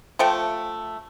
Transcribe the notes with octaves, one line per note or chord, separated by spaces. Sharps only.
F3 A3 A4 G5